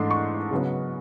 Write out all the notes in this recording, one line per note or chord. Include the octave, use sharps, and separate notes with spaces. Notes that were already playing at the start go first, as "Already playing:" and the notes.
Already playing: G#2 E3 A3 D4 C6
C#6
C#3 F#3 B3